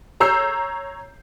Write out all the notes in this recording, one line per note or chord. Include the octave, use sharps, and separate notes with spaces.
C#5 A#5 E6 G6 C7